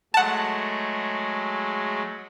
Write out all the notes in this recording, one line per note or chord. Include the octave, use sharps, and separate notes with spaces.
F#3 G#3 A3 F#5 A5